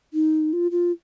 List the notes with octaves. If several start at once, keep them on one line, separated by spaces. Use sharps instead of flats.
D#4
F4
F4